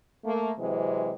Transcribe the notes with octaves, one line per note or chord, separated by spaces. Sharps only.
A3 A#3
C3 E3 F#3 G#3 C4